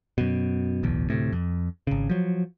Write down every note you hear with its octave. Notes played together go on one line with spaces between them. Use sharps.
F#2 B2
D1 B1 E2
D2 A2 C3
F2
G#1 C#3
F3 F#3